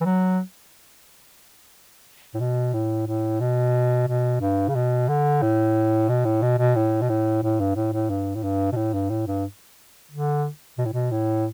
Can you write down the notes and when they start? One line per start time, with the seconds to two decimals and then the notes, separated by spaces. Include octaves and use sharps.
0.01 E3
0.05 F#3
2.34 A2
2.40 B2
2.74 A2
3.07 A2
3.40 B2
4.08 B2
4.41 G2
4.69 C#3
4.75 B2
5.09 D3
5.42 A2
6.09 B2
6.25 A2
6.42 B2
6.58 B2
6.75 A2
7.02 B2
7.10 A2
7.43 A2
7.60 G2
7.76 A2
7.93 A2
8.10 G2
8.36 A2
8.43 G2
8.72 B2
8.76 A2
8.94 G2
9.10 A2
9.27 G2
10.11 D3
10.78 B2
10.85 A2
10.93 B2
11.11 A2